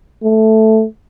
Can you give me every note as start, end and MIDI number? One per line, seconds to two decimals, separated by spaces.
0.23 0.85 57